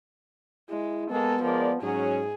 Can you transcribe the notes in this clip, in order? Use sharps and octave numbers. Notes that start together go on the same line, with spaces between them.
G#3 E4
G#3 A#3 B3 A4
F3 G#3 A#4 D5
G#2 F#3 C#4 G#4